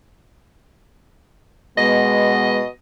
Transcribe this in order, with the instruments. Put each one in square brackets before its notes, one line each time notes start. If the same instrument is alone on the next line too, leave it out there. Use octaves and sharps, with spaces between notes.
[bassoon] B2 [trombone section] G#3 B3 [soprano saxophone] D#5